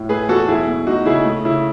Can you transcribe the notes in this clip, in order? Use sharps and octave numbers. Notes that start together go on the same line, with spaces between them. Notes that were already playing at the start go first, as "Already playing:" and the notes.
Already playing: A2
A3 G#4 B4
E2 F#4 A4
B1 E4 G#4
B2
A3 D#4 F#4
C#3 E4 G#4
A3
C#3 E4